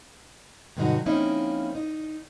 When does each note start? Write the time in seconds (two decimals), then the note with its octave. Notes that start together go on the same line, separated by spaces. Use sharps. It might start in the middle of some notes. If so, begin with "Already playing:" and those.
0.77 G2 B2 D3 F#3 D#4 F#4
1.06 F3 A#3 C4 C#4 D#4 E4
1.75 D#4